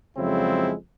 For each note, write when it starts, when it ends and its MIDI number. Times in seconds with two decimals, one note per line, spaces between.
0.17 0.73 41
0.17 0.73 49
0.17 0.73 54
0.17 0.73 56
0.17 0.73 60
0.17 0.73 64